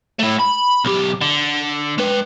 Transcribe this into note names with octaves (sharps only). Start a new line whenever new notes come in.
A3 E4
B5
B1 G4
D3
G#3 B4